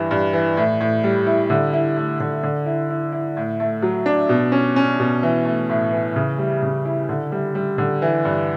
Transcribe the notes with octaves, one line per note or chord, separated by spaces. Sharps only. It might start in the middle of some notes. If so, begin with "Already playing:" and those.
Already playing: G2 E3
G2
E3
A2
A2
G3
E4
D3
E4
A3
D3
D3
E4
E4
E4
A2
A3
F#3
D4
B2
C#4
C#4
B2
E3
A3
A2
E3
C#3
G3
C#3
E4
D3
G3
G3
D3
E3
G2